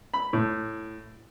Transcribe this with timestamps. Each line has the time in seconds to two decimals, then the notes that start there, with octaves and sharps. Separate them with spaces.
0.14 B5
0.33 A2